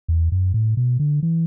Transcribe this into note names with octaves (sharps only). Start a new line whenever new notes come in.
E2
F#2
A2
B2
D3
E3